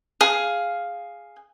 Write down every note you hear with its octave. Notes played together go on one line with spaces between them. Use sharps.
G#4 F5